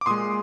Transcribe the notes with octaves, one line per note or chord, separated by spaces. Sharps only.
D6
A#2 G#3 C6 D#6